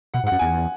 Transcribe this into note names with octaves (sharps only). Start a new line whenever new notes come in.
B2 F#5
G#2
F#5
F#2
E2 G#5